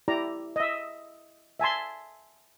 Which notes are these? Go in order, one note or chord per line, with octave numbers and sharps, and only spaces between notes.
E4 G4 D5 A#5
D#5 E5
E5 G#5 A5 C6